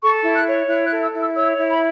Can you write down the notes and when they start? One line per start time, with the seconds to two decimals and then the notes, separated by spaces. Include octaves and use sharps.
0.02 A4 C#6
0.23 E4
0.35 F#6
0.46 C#5
0.68 E4 F#6
0.86 F#6
0.91 A4
1.02 E6
1.14 E4
1.20 E6
1.36 C#5 E6
1.59 E4
1.71 B5